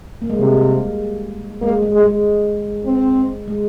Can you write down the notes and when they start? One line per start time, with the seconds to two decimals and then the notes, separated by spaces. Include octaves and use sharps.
0.22 A#3
0.30 G#3
0.38 C3 G3
1.61 G#3 A#3
1.82 G#3
1.93 G#3
2.03 G#3
2.85 C4
3.48 G#3